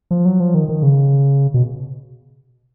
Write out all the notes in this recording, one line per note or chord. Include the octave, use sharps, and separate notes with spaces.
F3
F#3
F3
D#3
D#3
C#3
B2